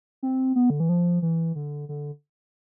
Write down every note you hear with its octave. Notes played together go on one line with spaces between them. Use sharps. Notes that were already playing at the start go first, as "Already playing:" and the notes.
C4
B3
D3
E3
F3
E3
D3
D3